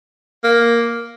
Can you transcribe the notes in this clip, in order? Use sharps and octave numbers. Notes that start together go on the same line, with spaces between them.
A#3